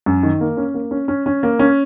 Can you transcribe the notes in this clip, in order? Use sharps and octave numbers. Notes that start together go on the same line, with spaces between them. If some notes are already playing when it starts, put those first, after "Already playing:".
F#2
D#3
A#3
C#4
A#3
C#4
C#4
C#4
A#3
C#4